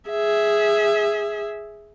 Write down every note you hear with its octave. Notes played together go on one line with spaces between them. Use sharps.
G#4 E5